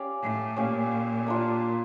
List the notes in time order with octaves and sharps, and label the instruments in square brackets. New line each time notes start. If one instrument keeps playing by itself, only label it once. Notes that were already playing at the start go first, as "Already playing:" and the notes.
Already playing: [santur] C#4 G4 D5 F5
[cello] A2
[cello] A#2 [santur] C#4 G4 D5 F5
[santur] A#3 D4 F4